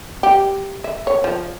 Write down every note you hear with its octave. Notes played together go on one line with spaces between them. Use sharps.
G4
E5
C#5
F3